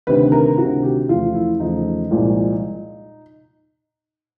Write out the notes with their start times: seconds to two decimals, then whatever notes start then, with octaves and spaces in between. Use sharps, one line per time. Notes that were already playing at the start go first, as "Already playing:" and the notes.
0.07 D2 C3 D#3 B4
0.32 A#4
0.57 D2 C3 D#3 F#4
0.83 G4
1.08 E2 C#3 F3 A3 F4
1.34 E4
1.60 E2 C#3 F3 A3 D#4
2.11 C2 A#2 F3 G#3